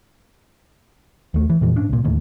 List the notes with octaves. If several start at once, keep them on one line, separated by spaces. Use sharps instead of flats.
D#2 A3
E3
F2 A#2 E3
G#2 C#4 D4
C2 A#2
D1 D#2 A2